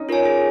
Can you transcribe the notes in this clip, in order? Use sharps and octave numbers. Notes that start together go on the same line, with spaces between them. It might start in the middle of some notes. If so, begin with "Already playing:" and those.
Already playing: C#4 D#4
F4 A#4 C#5 G#5
G#4